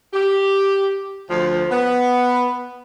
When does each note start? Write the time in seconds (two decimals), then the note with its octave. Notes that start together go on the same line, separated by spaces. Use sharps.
0.14 G4
1.30 D2 F3
1.71 B3